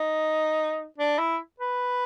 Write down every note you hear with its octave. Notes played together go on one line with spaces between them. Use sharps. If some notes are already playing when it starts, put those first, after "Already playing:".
Already playing: D#4
D4
E4
B4